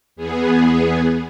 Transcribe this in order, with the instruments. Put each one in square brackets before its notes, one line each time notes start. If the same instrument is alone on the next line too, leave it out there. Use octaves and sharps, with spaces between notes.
[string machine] E2 B3 G#4